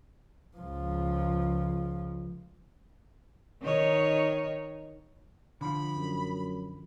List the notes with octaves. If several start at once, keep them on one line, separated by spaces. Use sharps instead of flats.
C#2 F3
D#3 D#4 C#5
D3 F3 B5
F#2